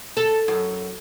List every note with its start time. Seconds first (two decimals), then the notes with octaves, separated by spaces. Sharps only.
0.17 A4
0.48 F#2